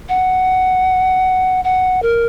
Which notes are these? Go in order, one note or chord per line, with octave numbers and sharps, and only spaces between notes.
F#5
F#5
A#4